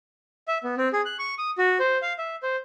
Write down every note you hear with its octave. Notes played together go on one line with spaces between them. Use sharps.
E5
B3
C4
G#4
F#6
C#6
D#6
F#4
C5
F5
E5
C5